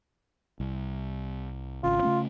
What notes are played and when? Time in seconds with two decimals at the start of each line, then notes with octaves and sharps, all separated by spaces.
0.60 C2
1.84 G#1 C#3 F4
2.02 C#3 A3 C#4